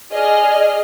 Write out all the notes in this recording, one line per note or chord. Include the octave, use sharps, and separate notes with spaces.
G#4 D5 D#5 F6